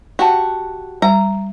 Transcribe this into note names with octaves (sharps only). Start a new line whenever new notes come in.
F#4 G4 F#5 A5
G3 A#5